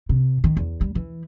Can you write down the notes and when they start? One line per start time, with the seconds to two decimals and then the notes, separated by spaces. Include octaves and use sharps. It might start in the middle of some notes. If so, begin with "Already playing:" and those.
0.09 C3
0.44 D#3
0.57 E2
0.81 G3
0.95 E3